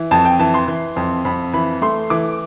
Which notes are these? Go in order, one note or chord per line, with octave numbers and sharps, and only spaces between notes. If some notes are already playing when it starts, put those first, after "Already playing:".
Already playing: E3
F2 A5
G5
E3 A5
C6
E3
F2
F2 B5
E3 B5
A3 C6
E3 D6